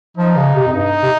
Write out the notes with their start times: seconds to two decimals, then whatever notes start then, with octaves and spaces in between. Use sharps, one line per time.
0.17 F3 D#4
0.37 C#3
0.55 C3
0.67 F2
0.73 G2 D#4
1.03 C3